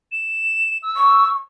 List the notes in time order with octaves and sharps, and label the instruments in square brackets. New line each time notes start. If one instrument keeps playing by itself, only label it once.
[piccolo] E7
E6
[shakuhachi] C#6